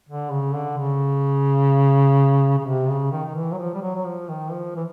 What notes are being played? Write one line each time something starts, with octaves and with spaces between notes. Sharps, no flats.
D3
C#3
D3
C#3
C#3
C3
C#3
D#3
D#3
E3
F#3
F3
G3
F#3
F#3
F3
D#3
F3
E3